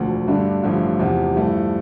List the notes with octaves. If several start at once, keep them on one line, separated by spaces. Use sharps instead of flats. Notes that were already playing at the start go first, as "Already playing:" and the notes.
Already playing: E1 D2 D3 F3
G2 D3 A3 D4
A1 G2 D3 F3 A3
E2 C3 F3
G2 F3 A3 E4